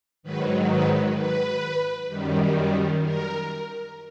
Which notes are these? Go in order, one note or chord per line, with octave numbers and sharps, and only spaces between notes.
G#2 D#3 F#3 B4
B4
B4
F#2 D#3 G3
A#4